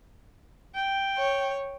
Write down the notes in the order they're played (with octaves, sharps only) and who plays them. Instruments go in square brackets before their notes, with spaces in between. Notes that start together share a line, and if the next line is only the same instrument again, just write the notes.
[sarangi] G5
[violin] C#5